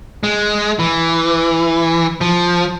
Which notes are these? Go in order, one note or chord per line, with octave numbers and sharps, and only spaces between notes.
G#3
E3
F3